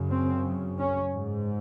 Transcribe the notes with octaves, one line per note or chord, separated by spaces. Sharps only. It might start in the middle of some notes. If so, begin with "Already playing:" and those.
Already playing: F#2 C#3
C4
C#4
G#2